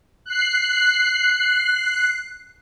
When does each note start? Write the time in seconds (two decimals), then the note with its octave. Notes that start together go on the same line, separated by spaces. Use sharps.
0.25 F#6 C7